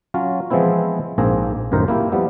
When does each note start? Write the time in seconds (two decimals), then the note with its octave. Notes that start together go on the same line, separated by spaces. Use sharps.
0.14 F#3 C#4 F4
0.50 E3 F3 G#3 B3 C4 E4
1.18 A#1 G#2 A#3 C4 G#4 A#5
1.71 C2 F#2 A2 D#3 A#4 C5
1.88 A#3 E4 G4
2.12 F3 G3 B3 E4